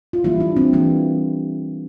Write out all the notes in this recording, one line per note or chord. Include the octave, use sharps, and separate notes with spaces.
F4
E3 G3 A#3 E4
D4
C4
E3 G3 A#3